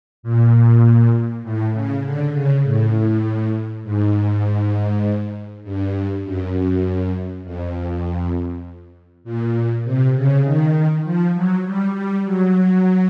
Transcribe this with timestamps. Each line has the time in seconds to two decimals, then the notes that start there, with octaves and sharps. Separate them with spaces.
0.23 A#2
1.43 A2
1.73 C#3
2.03 D3
2.34 C#3
2.64 A2
3.84 G#2
5.64 G2
6.24 F#2
7.44 F2
9.24 A#2
9.84 C3
10.15 C#3
10.45 D#3
11.04 F3
11.34 F#3
11.65 G3
11.95 G3
12.25 F#3